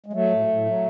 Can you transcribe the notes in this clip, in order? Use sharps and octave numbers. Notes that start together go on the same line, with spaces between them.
G#3
F#3 A3
A2
A2
F#3